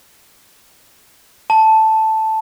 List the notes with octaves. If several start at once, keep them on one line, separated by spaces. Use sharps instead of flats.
A5